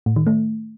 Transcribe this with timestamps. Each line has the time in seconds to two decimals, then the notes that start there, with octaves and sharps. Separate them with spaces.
0.06 A2
0.16 D#3
0.27 A3